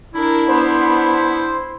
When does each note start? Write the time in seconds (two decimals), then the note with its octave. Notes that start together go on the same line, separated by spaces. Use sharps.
0.15 D4 E4 A#4
0.48 B3 D4 C5